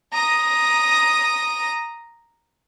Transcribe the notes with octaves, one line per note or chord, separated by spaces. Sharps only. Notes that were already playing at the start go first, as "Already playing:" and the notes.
A#5 D#6